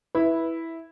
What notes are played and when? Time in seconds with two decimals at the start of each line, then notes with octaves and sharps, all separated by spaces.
0.15 E4 B4